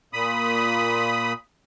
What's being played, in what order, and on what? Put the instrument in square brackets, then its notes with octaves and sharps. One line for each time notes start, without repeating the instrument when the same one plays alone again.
[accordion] A#2 B5 D#6